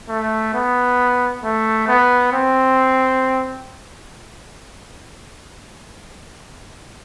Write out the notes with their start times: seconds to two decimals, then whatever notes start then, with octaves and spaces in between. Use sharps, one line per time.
0.09 A3
0.54 B3
1.44 A3
1.88 B3
2.33 C4